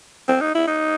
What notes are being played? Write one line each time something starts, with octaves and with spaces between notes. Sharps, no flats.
C4
D#4
E4
D#4